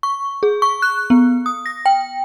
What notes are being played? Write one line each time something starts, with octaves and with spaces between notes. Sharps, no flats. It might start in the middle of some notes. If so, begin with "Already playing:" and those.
C#6
G#4
C#6
F#6
B3
D#6
A#6
G5